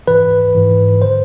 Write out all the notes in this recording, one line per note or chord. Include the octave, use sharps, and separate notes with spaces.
G#2 E3 B4
G#2 E3
D3 C5